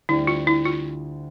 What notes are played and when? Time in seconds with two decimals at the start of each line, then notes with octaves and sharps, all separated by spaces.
0.09 D2 D3 G3 E4
0.27 F4
0.47 E4
0.65 F4